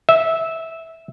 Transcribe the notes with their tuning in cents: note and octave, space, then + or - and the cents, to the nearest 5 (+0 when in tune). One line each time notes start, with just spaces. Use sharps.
E5 -10